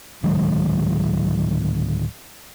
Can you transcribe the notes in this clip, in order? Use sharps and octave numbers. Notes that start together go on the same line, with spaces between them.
D1 D#3 F#3 G#3